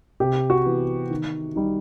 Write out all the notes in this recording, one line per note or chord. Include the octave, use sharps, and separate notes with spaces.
C3 G4
F#4
E3 B3
D#3
G3 D#4